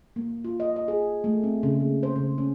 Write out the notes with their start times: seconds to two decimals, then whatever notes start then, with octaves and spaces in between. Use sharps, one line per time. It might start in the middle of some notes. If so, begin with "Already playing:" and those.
0.16 A#3
0.45 F4
0.60 D#5
0.76 D#5
0.88 G#4
1.24 A3
1.43 C4
1.63 C#3
1.80 A#3
2.03 C5
2.16 C#3
2.38 C#4